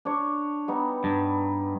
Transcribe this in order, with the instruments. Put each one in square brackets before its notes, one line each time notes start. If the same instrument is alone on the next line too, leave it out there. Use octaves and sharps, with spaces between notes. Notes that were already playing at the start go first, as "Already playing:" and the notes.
[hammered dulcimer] D4 C#5
G3 B3 D#4
[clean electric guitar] G2